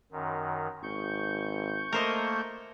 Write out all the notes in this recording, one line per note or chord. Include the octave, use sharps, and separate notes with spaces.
F#2 D#3
G#1 C#6 G6
A3 A#3 A#4 C5 D#5